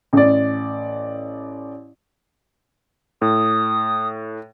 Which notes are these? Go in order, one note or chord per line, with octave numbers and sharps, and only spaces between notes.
A1 D5
A2 D#6